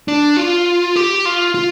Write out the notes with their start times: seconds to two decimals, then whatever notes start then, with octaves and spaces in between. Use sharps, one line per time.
0.08 D4
0.37 F4
0.96 G4
1.25 F4
1.54 F4